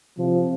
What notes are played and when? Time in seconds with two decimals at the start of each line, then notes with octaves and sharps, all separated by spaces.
0.19 C3 F3